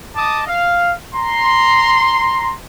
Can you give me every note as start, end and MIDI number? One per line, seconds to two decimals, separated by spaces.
0.15 0.43 75
0.15 0.43 81
0.15 0.43 86
0.15 0.43 87
0.47 0.93 77
1.14 2.53 82
1.14 2.53 84